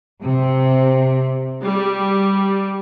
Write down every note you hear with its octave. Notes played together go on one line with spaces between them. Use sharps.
C3
G3